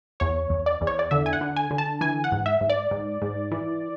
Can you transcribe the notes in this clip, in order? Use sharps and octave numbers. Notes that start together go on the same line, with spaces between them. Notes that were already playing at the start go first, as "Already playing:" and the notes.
E2 C#5
E2
D5
E2
C#5
D5
D3 E5
G#5
F#5
D3
G#5
D3
A5
E3 G#5
F#5
G#2
E5
G#2
D5
G#2
G#2
E3